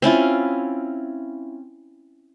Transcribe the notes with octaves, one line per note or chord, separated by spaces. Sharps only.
C4 C#4 E4 F4